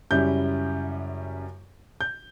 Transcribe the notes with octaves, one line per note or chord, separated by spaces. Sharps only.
F#2 C#3 G3 C#4 E4 G6
G6